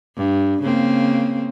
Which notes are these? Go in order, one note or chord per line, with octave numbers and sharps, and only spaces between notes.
G2
C#3 A#3 C4